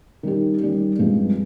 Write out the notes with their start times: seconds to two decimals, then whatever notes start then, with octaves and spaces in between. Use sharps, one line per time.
0.23 D#3 G3 C#4 G4
0.61 D#3 G3 C#4 G4
0.99 G2 F3 G#3 C4 F4